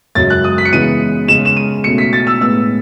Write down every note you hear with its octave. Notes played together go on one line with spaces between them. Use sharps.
F#2 C#3 G#3 A6
F#6
D#6
B6
C#7
C#3 E3 G#3 B3 D#7
C#3 G#3 C#4 E7
E7
D#7
B2 A3 C#4 C#7
B6
A6
E6
A2 G#3 B3 E6